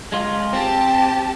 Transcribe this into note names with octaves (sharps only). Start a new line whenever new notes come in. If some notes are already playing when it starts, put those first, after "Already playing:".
G#3 F4
C4 G4 A5